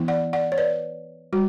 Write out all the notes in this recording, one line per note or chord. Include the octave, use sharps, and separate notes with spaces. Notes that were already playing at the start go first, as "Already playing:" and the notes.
Already playing: E3 B3 E4
D5 F#5
D5 F#5
C#5
B4 D5
G3 F#4